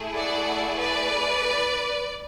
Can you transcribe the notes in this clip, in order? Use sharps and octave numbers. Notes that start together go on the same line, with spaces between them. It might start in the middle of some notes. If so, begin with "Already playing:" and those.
Already playing: A3 E4 G#4
D5 F#5
B4 D5